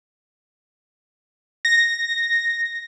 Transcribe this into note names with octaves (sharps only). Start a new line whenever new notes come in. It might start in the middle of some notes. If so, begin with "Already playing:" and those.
A#6